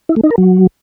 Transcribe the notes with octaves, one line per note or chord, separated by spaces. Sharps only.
E4
A3
D#4
A#4
F#3